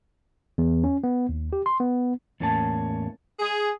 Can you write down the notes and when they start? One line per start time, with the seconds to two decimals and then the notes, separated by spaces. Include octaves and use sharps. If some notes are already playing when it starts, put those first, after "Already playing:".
0.58 E2
0.84 C#4
1.04 B3
1.29 D#2
1.53 G4
1.66 C6
1.80 B3
2.40 E2 A2 A#3 C#4 A5
3.40 G#4